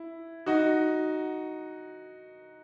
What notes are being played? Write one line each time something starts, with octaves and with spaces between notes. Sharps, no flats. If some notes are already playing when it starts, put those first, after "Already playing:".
Already playing: E4
D#4 F#4